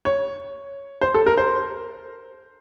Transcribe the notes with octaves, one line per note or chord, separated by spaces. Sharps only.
C#5
C5
A4
A#4
C5